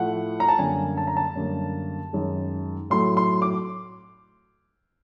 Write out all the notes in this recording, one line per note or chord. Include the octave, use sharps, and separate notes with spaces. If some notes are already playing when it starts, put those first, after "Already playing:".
Already playing: A2 F3 A3 F#5
A#5
A5
F#2 D3 G3 A#3 G#5
A5
A#5
A5
F#2 D3 G3 A#3
F#2 D#3 G#3
A2 F#3 A3 C6
C6
D6